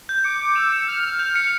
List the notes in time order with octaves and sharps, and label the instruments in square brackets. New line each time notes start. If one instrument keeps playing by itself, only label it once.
[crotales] G6
[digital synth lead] D6 [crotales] C#7
[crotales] C#7
[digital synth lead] E6 [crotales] F7
[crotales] C#7
[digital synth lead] F6 [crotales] G6
[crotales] F7
G6
C#7